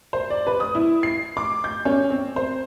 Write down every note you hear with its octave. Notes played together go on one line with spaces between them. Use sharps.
C5
D5
B4
D#6
E4
C7
D6
G6
C#4
C4
C5